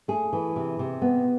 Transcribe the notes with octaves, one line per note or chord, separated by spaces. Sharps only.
A3 G#4
E3
C3
C3
B3